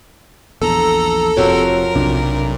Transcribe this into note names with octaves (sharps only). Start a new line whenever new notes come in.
A#1 E2 A4 A#5
F1 C3 F3 F#4 A#4 C#5
B1 C3 D4